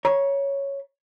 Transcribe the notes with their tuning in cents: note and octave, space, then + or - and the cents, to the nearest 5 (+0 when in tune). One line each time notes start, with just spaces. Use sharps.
C#5 +0 A#5 +35